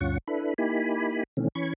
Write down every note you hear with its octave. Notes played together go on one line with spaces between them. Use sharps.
D2 G2 C#4 F4 F#5 C#6
D4 E4 A4 B4 B5
A#3 D#4 E4 G4 G#5 B5
B2 D#3 E3 A3 C4 C#4
E3 C#4 B5 C#6 G#6